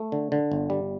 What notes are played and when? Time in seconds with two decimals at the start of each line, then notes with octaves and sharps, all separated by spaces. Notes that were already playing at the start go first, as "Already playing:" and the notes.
Already playing: A3
0.12 D3
0.32 D3
0.52 G1
0.70 G3